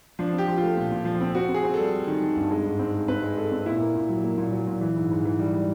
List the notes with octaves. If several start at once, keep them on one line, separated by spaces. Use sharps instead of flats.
F3 D4
C4 G4
F3
F4
A3
A#2
A#2
F3
C4
C4 F#4
C4
G#4
C4
G3 A4
G3
D#3
D#3
G2
G#3
G#2
C4
G#3
C4 B4
G#3
G#3 A4
C4
A#2 E4
A#3
A#2
F#3
A#3
A#2
F#3
A#2
E3
G#2
G#2
E3
G3
G3